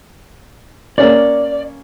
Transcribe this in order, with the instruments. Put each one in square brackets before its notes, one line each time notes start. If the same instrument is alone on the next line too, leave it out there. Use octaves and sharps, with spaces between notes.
[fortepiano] A#3 C#4 C#5 [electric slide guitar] D5